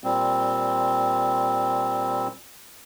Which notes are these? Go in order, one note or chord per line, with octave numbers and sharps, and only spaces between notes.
A#2 G3 C4